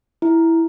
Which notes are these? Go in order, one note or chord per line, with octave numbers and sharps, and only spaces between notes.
E4